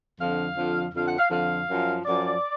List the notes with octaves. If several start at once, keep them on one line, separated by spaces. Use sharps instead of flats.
F2 D3 F3 F5
F2 D3 F3
F2 D3 F3 F5
F#5
F5
F2 D3 F3 F5
F#2 F3
F#2 F3 D5